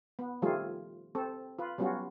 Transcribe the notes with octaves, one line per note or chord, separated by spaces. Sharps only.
B3
D#3 F3 G3 A3 F4 G#4
C4 A4
F4 B4
F#3 G3 B3 C#4 F4 F#4